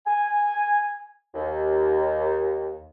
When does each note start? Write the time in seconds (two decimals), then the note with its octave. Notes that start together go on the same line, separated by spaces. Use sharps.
0.06 G#5
1.35 D#2